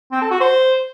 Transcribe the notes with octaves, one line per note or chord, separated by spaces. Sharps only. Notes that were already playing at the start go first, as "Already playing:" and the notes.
C4
A4
F#4
C5